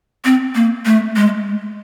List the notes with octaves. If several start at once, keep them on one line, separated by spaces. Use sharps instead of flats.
C4
A#3
A3
G#3